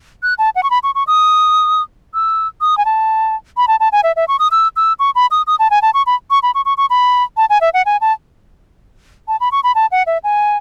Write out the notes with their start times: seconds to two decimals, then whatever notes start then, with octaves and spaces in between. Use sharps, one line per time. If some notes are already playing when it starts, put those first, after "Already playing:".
0.23 F#6
0.39 A5
0.56 F#5
0.63 C#6
0.70 B5
0.83 C#6
0.95 C#6
1.07 D#6
2.14 E6
2.61 D#6
2.78 G#5
2.85 A5
3.57 B5
3.68 A5
3.80 A5
3.92 G#5
4.04 E5
4.16 E5
4.28 C#6
4.39 D#6
4.51 E6
4.76 E6
4.99 C#6
5.15 B5
5.31 D#6
5.47 D#6
5.59 A5
5.71 G#5
5.82 A5
5.94 C#6
6.06 B5
6.31 C#6
6.43 B5
6.55 C#6
6.66 C#6
6.78 C#6
6.90 B5
7.37 A5
7.50 G#5
7.61 E5
7.74 F#5
7.86 G#5
8.01 A5
9.28 A5
9.40 B5
9.52 C#6
9.64 B5
9.75 A5
9.92 F#5
10.07 E5
10.24 G#5